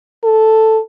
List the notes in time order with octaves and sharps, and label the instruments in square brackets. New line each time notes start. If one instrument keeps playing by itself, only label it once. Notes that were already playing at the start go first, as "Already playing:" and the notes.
[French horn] A4